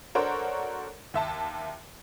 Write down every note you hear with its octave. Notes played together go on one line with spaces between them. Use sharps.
D4 F#4 A4 A#4 C5 C#5
D#2 E5 A5